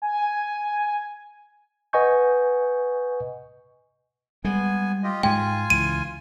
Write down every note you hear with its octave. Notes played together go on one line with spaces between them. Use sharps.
G#5
B4 D#5 F#5 G#5 C#6 G6
G3 G#3 B3 G#5
F4 G4 D#5
G#2 G#3 F4 G5 G#5
C#2 E3 D#7